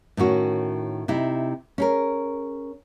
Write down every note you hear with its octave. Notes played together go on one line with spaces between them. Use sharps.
A2 D#3 C#4 F#4
C3 D#4 E4
C#4 G#4 A#4